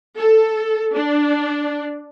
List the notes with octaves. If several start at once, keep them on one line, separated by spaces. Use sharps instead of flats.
A4
D4